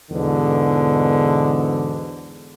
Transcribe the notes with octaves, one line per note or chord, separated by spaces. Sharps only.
E2 G#2 B2 D3